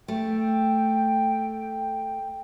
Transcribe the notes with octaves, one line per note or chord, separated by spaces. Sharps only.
A3 G5